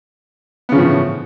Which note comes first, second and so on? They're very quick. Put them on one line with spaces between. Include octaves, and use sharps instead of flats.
B3 C#3 F3 A2 E3